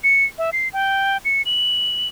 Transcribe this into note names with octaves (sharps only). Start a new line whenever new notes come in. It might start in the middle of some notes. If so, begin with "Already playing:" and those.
C#7
E5
C7
G5
C#7
F#7